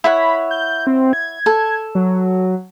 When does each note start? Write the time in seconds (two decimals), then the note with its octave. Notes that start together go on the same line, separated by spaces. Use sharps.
0.04 E4 C#5 F#5 B5
0.51 G6
0.87 C4
1.13 G#6
1.46 A4
1.95 F#3